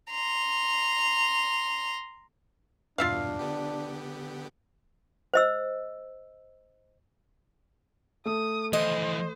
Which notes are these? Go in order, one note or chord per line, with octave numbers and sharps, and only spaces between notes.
A#5 C6
E2 G2 B2 D4 F4 E5 F5
D3 B3 G4
C5 D#5 E6
A3 D#6
E3 F3 C5 D#5